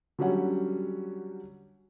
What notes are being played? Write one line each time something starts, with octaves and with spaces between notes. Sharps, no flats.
D3 F#3 G3 C#4 F#5